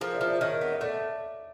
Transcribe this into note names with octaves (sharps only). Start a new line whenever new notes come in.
F3 G#4 A#4
D5 E5
F3
D5 E5
D#3 C#5 D#5
B3
D#5
A3 D5 E5